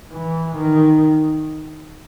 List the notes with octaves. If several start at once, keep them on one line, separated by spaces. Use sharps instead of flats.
E3
D#3